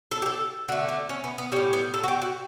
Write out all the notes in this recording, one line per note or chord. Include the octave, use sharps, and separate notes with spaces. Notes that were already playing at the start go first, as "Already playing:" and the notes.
A4
G4
A4
D3 A3 F#4
D4
C#4
B3
B3
A2 G3 C#4
B3
A4
F#4
G4
F#4